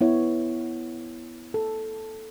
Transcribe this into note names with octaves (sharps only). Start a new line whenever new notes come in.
B3 E4 C#5
A4